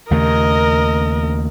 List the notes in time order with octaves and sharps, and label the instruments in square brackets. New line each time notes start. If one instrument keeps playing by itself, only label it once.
[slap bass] D#2 C#3 A3 [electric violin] A#4 D#5